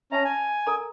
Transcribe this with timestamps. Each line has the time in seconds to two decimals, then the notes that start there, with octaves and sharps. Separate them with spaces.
0.12 C#4 E5 A5 A#5
0.25 G#5
0.67 A4 A#4 A#5